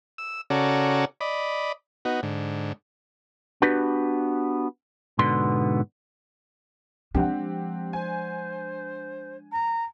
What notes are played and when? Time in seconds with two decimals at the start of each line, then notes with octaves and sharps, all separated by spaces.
0.18 E6
0.50 C#3 C#4 F#4 A4 D5 A#5
1.21 D5 D#5 B5
2.05 B3 D#4 F#4
2.23 G#2 D3
3.62 B3 D4 F#4 G4 B4
5.19 G#2 B2 D3 B3 C6
7.15 F3 G#3 C4 D4 G4 F#5
7.93 C5 G#5
9.52 A#5